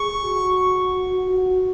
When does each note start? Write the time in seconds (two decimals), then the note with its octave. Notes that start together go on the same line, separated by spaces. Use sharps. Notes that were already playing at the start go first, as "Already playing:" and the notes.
Already playing: G#4 C#6
0.24 F#4
1.30 F#4